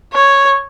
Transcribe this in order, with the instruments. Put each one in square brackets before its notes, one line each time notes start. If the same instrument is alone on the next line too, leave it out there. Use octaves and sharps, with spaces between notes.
[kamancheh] C#5